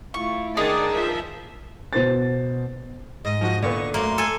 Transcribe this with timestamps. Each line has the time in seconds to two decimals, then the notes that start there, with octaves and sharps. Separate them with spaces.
0.14 A3 E4 F4 C#6
0.57 D#3 D4 D#4 G#4 D5 A5
0.91 F3 A#4 E5
1.93 B2 C5 A6
3.25 G#2 D#5
3.41 F3 F#4
3.63 A#2 D3 B3 C#6
3.94 F#2 F#3 A3 A#3 C6
4.18 A4 G#5